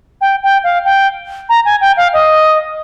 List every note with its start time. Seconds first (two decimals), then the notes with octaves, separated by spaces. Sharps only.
0.21 G5
0.43 G5
0.64 F5
0.85 G5
1.49 A#5
1.65 G#5
1.81 G5
1.97 F5
2.13 D#5